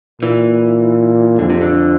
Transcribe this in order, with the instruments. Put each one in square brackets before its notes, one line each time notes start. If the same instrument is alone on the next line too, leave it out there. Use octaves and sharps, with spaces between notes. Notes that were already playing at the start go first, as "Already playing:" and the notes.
[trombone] A#2 [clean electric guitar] E3
[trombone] F2 [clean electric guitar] D3
[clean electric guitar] C3
D3